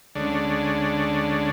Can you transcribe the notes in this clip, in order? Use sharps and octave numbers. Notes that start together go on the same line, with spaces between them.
D2 D3 G#3 C#4 D4